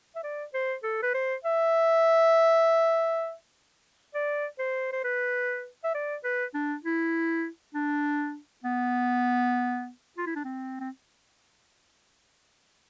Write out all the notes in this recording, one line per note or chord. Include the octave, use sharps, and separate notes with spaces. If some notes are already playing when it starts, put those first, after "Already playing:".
E5
D5
C5
A4
B4
C5
E5
D5
C5
C5
B4
E5
D5
B4
D4
E4
D4
B3
F4
E4
D4
C4
C4